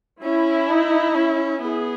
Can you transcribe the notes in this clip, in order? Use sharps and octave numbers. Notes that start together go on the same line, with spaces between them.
C#4 E4
D#4
C#4
B3 G#4